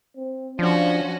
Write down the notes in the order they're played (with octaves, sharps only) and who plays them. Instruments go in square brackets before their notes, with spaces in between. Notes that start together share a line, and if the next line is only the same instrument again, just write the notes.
[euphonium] C4
[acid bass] F3 [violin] C#4 F#4 [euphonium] D4